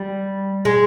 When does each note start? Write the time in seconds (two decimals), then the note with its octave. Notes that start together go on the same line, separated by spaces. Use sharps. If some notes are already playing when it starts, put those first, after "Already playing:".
Already playing: G3
0.65 G#3